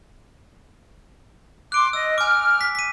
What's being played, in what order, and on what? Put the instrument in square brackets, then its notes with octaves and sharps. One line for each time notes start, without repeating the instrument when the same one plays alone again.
[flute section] C6 D6 [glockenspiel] F#6 D7
[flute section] D#5 [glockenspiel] E6
[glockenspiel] G#5 D6 [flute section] F6
[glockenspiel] B6
B6 D#7